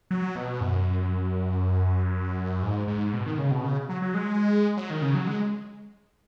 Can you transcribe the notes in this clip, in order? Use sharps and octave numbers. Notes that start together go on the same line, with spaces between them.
F#3
B2
F#2
G#2
G#2
B2
D#3
C#3
B2
C#3
F#3
F#3
G#3
F#3
D#3
C#3
F#3
G#3